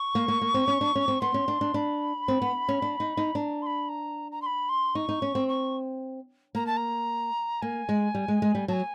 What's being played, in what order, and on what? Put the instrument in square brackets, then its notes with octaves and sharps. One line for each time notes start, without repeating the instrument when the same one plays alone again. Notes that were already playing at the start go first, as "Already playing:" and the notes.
Already playing: [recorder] C#6
[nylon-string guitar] A#3
A#3
A#3
C4
C#4
D4
C#4
C4
[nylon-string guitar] B3 [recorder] C6
[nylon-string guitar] C#4
D4
D4
[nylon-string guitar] D4 [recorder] B5
[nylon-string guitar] C4
B3
C#4
D4
D#4
D#4
[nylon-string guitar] D4 [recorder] A#5
[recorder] C6
B5
A#5
A#5
C6
B5
C6
[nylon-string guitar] D#4 [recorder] C#6
[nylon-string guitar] D#4
C#4
C4
[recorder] C#6
[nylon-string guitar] A#3 [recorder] A#5
[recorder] A5
A#5
[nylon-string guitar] A#3 [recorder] G#5
[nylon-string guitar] G#3
G3
G#3
G#3
G3
[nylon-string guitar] F#3 [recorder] G#5 A5